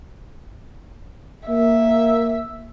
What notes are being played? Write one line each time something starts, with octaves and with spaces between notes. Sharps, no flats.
A#3 E5